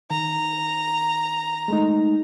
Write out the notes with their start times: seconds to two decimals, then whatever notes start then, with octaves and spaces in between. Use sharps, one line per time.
0.11 D#3 A#5
1.68 G#3 A3 D#4